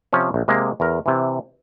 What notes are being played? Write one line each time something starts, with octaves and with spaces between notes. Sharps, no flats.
C3 F3 C#4
A#1
C3 G#3 A#3
E2 A#4
C3 E3